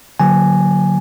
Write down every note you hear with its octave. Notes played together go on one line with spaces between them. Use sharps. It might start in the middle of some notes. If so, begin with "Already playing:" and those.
D3 F#3 A#3 G#5